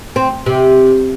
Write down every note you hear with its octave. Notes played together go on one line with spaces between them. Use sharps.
C4
C3